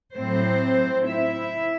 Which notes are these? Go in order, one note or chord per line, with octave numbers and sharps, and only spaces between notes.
A2 F#3 C4 C5
E4 E5